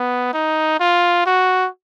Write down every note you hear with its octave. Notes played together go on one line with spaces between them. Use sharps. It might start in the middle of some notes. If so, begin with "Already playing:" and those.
Already playing: B3
D#4
F4
F#4